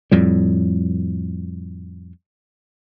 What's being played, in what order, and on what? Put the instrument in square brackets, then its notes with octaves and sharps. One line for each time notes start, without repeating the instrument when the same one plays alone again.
[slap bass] F2 A2 G3